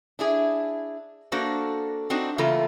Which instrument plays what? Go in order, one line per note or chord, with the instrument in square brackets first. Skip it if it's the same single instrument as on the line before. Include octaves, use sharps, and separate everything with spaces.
[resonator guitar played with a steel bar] D4 E4 G#4
A#3 D4 F#4 A4 C5
C4 D4 D#4 F#4 C5
C#3 E3 A3 A#3 F4 A4